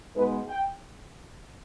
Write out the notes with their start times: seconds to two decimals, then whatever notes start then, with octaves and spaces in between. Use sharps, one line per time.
0.16 B2 G#3 B3 D#4 B4
0.48 G5